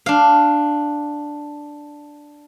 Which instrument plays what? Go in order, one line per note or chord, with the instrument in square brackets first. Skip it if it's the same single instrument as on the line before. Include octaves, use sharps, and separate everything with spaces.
[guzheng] D4 F5